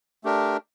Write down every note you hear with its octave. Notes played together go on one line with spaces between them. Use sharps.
A3 D4 G4 A#4